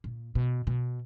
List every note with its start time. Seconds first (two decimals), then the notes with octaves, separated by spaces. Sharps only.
0.04 A#2
0.35 B2
0.67 B2